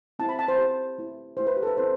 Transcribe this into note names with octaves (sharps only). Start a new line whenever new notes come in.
C4 E4 G4 A5
B5
A5
C5
C4 E4 G4
A3 E4 G4
A3 E4 G4 C5
B4
G4
A4
B4
C4 E4 G4 C5